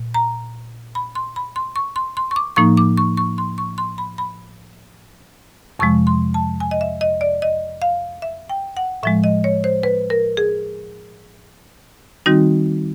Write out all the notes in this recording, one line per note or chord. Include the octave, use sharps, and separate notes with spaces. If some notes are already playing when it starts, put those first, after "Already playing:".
Already playing: A#2
A#5
B5
C6
B5
C6
C#6
C6
C6
C#6
D6
A2 F3 A#3 D#4 C#6
D6
C#6
C#6
C6
C#6
C6
B5
B5
F2 C3 F3 G#3 C#6
C6
A5
G#5
D#5
E5
D#5
D5
D#5
F5
E5
G5
F#5
A2 F3 G#3 E5
D#5
C#5
C5
B4
A#4
G#4
D#3 G3 C4 D#4 F#4